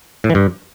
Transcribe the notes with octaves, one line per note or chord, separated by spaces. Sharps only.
A2
E3
G2